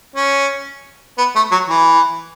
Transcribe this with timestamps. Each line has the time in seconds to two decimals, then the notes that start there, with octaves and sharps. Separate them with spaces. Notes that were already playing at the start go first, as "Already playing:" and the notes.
0.16 C#4
1.18 B3
1.35 A3
1.51 F#3
1.69 E3